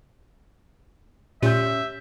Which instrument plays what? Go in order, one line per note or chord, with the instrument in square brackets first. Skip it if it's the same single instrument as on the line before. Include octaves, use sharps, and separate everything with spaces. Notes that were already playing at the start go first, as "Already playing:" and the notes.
[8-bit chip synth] A#2 [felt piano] C#4 G6 [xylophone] G4 [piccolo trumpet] E5